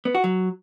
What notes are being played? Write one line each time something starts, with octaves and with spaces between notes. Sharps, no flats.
B3
F#4
F#3